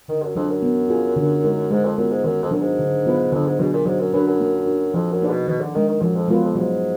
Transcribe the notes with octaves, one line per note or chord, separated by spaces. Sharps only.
D3 D#3
F#2
F2 F#3 D4
F#2
B3
F4 G#4
D3
G#3 D#4 A#4
G#2 G#3
F2
F#2 B3 F4 G#4
G#2
F#2 D#3
F2
F#2 F#3 D4 F#4 A#4
G#2
D3
F#3 B3 F4 B4
F2 D3
G#2
B2 F#3 D4 G#4
A#2
G#2 F#3
F#2
F#2 D4 F#4 B4
F#2
A#3
D4 F#4
F2 F3
F#2
D3 A#3 D#4 G#4 B4
B2
B2 D#3
D3
D#3 G#3 D4
D#3
F#2 F3
F2
F#2 G#3 B3 F4 B4
F2
G#2 F#3